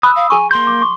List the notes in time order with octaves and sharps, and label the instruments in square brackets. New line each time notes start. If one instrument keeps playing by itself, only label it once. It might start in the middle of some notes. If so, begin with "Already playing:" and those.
[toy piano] B5 [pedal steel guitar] D#6 E6 [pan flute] F#6
[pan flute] F5
[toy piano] G#4 C#6 [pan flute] G#5
[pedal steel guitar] A#3 G6 [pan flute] C6
[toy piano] D6
C#6 D6